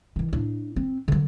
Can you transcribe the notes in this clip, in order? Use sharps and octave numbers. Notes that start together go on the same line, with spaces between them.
D#3 E3
A2 D4
C4
D3 F#3